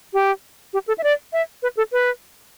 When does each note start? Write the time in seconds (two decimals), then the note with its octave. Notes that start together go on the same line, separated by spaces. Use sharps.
0.13 G4
0.73 G4
0.87 A4
0.98 E5
1.03 D5
1.33 E5
1.63 B4
1.77 A4
1.92 B4